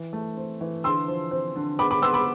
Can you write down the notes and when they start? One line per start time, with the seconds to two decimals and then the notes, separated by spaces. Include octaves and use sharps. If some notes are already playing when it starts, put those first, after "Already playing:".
Already playing: E3
0.13 A3
0.37 C4
0.61 E3
0.84 D3 C6 E6
1.08 F3
1.31 C4
1.56 D3
1.79 B3 B5 D6
1.91 B5 D6
2.02 B3 C6 E6
2.14 B5 D6